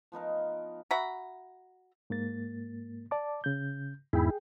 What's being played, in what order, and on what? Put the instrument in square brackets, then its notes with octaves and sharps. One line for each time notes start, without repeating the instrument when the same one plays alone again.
[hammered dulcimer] F3 B3 D#4 A#4
[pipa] F#4 E5 A#5 B5
[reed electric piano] G#2 A#3 A6
D5 A5 D6
C#3 G6
[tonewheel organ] E2 G#2 E4 [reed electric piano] G#4 G5